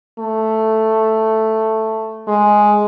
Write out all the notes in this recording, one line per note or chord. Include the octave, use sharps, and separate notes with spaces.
A3
G#3